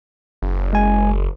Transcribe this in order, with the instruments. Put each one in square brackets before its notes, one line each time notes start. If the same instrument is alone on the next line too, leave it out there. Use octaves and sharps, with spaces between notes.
[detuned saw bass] F#1
[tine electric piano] G#3 G#5